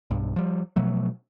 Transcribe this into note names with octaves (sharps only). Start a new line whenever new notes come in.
B1 G2
F3 G3
B2 F3 F#3 A3